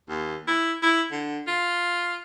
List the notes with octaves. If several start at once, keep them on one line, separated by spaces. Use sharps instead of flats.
D#2
E4
E4
D3
F4